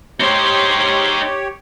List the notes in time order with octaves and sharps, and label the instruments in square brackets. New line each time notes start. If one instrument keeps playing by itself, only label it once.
[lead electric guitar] D#4 C5 [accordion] G4 C#5